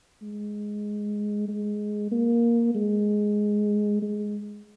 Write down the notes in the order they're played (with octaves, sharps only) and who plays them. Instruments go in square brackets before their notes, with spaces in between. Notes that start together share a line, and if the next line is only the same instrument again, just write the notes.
[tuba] G#3
G#3
A#3
G#3
G#3